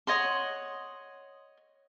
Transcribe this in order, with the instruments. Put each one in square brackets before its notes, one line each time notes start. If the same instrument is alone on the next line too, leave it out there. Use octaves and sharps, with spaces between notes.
[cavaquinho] C#5 D#5 F#5 C6